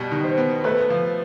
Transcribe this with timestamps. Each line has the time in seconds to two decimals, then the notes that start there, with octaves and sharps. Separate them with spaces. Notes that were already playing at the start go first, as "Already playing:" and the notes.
Already playing: B2 G3
0.12 D#3
0.24 C5
0.37 B3
0.64 A3 B4
0.90 F3